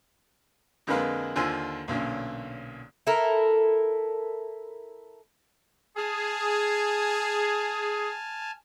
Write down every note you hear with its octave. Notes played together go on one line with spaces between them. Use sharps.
F2 D3 G#3 A#3 B4 F5
D#2 D3 F4 C5 G#5 E6
B1 A#2 D3 C#4
E4 A4 A#4
G#4 G#5 A5 F6